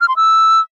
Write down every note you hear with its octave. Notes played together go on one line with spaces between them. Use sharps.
F6
C6
E6